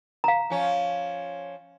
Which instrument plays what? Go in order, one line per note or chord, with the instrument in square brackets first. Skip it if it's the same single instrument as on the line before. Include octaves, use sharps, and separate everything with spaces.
[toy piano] F5 A#5
[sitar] F3 C#4